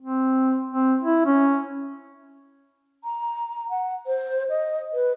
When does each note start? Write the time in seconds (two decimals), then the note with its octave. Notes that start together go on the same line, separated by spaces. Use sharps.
0.01 C4
0.72 C4
1.02 E4
1.26 C#4
3.04 A#5
3.70 F#5
4.07 C5
4.49 D#5
4.93 B4